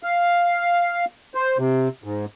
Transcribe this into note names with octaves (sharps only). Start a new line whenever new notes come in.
F5
C5
C3
G#2